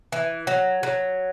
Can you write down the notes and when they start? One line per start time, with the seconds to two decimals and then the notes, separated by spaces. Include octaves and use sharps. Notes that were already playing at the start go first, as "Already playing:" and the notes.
0.12 E3
0.47 F#3
0.83 F#3